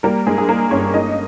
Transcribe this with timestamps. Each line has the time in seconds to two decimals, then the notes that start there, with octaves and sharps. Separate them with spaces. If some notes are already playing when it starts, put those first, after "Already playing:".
0.03 G3 A#3 A#4
0.27 G2 G#3 G#4
0.38 G#4
0.49 A#3 A#4
0.71 G1 C#4 C#5
0.94 A#3 D#4 D#5